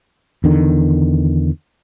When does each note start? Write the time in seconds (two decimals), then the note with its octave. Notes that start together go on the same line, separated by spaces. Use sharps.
0.44 E2 D3 D#3